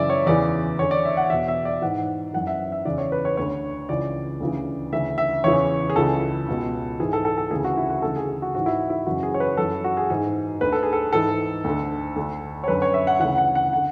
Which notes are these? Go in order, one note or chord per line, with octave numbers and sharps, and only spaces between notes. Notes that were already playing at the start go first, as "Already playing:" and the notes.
Already playing: F#2 C#3 E3 D5 E5
C#5
E2 C#3 E3 D5
E2 D3 C#5
D5
E5
F#5
E2 B2 E5
E5
D5
G#2 E3 F#5
F#2 E3 F#5
E5
E5
E2 C#3 E3 D5
C#5
B4
C#5
D2 D3 C#5
C#2 C#3 E3 D5
D2 C#3 E3
D2 C#3 E3 E5
E5
E2 C#3 E3 C#5
G#4
C#2 C#3 E3 A4
C#2 B2
G#2 E3 G#4
A4
A4
A4
D2 C#3 E3 G#4
F#4
E4
F#4
D2 C#3 E3 A4
G#4
G#4
F#4
G#2 E3 F#4
E4
E4
F#2 C#3 E3 F#4
G#4
C#5
B4
F#2 E3 A4
F#4
G#4
G#2 E3 G#4
D2 D3 B4
A4
G#4
A4
G#2 E3 A4
D2 D3
D2 D3
C#5
F#2 D3 B4
C#5
E5
F#5
D2 C#3 E3 F#5
F#5
F#5
D3 F#5